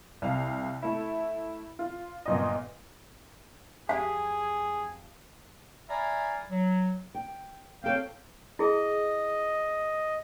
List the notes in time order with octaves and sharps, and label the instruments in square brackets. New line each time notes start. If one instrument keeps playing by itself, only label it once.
[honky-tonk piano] C2 F5
A3 E4
F4
G1 A#2 D#5
[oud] F2 G4 [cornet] G#4 [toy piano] F5
[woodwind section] D5 E5 F5 G#5 A#5 B5
F#3
[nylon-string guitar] G5
[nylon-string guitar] C4 A4 C#5 [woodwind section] F5 G5
[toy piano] E4 G#4 [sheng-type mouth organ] D#5